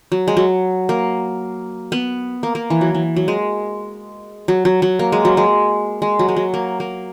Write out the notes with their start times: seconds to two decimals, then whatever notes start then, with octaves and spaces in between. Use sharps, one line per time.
0.12 F#3
0.28 G#3
0.37 F#3
0.89 A#3
1.92 B3
2.43 A#3
2.55 A#3
2.70 E3
2.81 F#3
2.95 E3
3.16 F#3
3.28 G#3
4.48 F#3
4.65 F#3
4.82 F#3
4.99 A#3
5.12 G#3
5.25 F#3
5.37 G#3
6.02 G#3
6.19 F#3
6.29 G#3
6.36 F#3
6.54 A#3
6.80 A#3